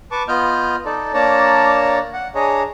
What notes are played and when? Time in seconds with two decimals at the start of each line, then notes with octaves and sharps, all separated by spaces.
0.11 B4 A5 C#6 D6
0.28 B3 F4 D#5 F6 G6
0.85 D#4 A4 D5
1.14 A#3 D4 C#5 D5 A5 A#5
2.14 F#5
2.35 D4 G#4 C#5 D#5 A#5